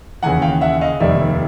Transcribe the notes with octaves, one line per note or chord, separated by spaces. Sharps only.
D#2 C#3 E3 F#5 G#5
F5 G5
E5 F#5
D#5 F5
F1 D#2 D#3 G3 D5 E5